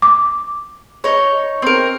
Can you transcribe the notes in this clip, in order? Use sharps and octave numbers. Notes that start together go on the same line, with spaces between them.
D6
D#4 C#5
C4 A#4